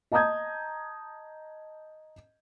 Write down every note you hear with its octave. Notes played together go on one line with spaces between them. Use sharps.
D#5 A5 A#5 D#6 G6 G#6